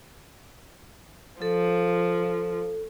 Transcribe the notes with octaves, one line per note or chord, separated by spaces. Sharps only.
F3 A4